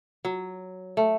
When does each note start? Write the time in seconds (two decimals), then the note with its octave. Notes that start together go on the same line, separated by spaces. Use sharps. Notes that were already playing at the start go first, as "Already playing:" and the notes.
0.25 F#3
0.97 A3